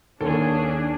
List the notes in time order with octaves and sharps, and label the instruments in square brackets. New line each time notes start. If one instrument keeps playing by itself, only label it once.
[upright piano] D#2 [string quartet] C#4 G#4 [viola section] D4 [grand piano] A4